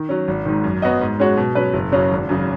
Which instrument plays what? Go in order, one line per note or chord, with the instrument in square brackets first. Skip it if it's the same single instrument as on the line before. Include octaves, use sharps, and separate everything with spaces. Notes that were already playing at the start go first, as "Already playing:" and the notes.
Already playing: [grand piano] D#3
F#3 C#4
G#1
G#2 D#3
F#2
F#3 B3 F#4 D#5
G#2
G#3 C#4 F#4 C#5
B2
F#3 C#4 B4
F#1
F#2 C#3 F#3 C#4
G#1
F#2 C#3